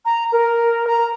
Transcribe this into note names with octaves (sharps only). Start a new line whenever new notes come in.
A#5
A#4
A#5